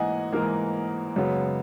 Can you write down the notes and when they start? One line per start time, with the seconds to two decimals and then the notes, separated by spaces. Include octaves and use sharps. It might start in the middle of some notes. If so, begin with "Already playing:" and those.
Already playing: G#2 E3 A#3 D#5 F#5 G#5
0.32 G#2 E3 A#3 A#4
1.16 F#2 C#3 G#3 B3